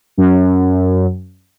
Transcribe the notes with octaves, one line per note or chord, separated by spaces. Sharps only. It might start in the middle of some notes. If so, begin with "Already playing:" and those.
F#2